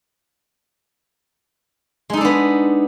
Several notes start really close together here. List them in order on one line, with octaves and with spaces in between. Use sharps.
G#3 D#4 A4 D4 B3